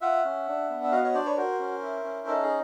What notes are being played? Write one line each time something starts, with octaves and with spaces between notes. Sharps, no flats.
F4 E5 F#5
C#4
D4
B3
E5
F#4 D#5 F5
C#5 D#5
D4 C5 D5
B4 C#5
F#4 A#4 C5
C#4
E4
C#4
D#4 A4
G#4